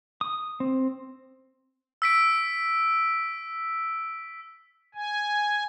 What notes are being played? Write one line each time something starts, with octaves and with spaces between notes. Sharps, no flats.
D#6
C4
E6 B6 D7
G#5